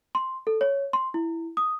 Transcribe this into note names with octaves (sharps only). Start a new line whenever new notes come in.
C6
A4
C#5
C6
E4
D#6